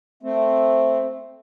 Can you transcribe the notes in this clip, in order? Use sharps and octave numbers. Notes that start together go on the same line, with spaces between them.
A3 C4